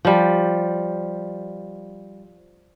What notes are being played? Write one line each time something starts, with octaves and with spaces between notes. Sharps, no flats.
F3 G3